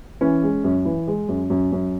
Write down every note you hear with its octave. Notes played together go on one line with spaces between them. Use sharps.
E3 C#4
G#3
F#2
E3
G#3
F#2
F#2
F#2